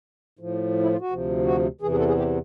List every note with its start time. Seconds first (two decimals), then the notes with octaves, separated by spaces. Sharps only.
0.39 A2 F3
0.83 E4
0.92 F4
1.01 F#4
1.10 D2 C3 F3
1.46 F#4
1.81 E2 C3 E3 G#4
1.91 G#4
1.99 A4
2.08 G#4
2.18 G4